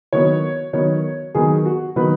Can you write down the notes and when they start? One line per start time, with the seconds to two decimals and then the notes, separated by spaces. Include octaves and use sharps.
0.13 D#3 F#3 B3 C#5
0.73 D#3 F#3 B3 C#5
1.35 D#3 F#3 B3 G#4
1.65 F#4
1.96 D#3 F#3 B3 B4